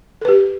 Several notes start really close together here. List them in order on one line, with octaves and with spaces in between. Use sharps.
A4 B4 G4